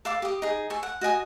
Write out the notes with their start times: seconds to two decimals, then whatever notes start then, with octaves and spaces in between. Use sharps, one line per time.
0.05 A4 F5 D6
0.22 G4 D#6
0.42 D#4 G#4
0.70 A4 C#5 G#5
0.83 F#5
1.01 F#4 D#5 G#5 D#6